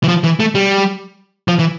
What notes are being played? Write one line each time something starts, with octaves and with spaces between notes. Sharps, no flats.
E3
F3
E3
A3
G3
F3
E3